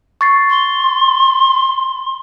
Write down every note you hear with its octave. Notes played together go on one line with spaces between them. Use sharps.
C#6 A6 C7
C6